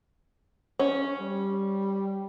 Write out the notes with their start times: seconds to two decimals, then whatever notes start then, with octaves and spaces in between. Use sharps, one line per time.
0.79 C#4
1.20 G3